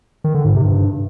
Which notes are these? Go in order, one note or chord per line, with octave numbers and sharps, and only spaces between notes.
D#3
D3
G#2
C3
G2